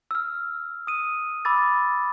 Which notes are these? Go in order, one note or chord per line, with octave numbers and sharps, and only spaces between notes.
E6 F6
D#6 D#7
B5 D6 E6 A6